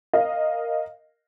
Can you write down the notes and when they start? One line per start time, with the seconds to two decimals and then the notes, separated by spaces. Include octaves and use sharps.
0.13 A#4 D#5 F5